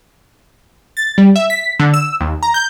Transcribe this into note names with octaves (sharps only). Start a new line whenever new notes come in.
A6
G3
E5
B6
D3
E6
D#2
A#5
G6